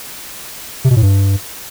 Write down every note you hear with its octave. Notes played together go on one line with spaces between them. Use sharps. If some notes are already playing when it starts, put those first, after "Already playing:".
C3
B2
A2
G2